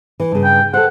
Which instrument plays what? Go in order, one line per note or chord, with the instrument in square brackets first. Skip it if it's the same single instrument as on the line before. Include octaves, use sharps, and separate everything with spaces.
[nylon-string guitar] E3
G2 C#3
[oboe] G5
[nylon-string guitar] A4 C5 [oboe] F#5